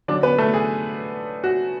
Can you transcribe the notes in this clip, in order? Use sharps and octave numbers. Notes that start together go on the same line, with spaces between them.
D3 F#3 C#4 D4 D5
B3 B4
A3 A4
G#4
F#4